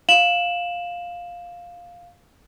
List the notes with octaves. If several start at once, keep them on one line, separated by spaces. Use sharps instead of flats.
F5 E7 F#7